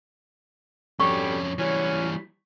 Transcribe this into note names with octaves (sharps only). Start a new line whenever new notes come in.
F2 B2 D3 G3 C#4 C#6
E3 F#3 G3 C#4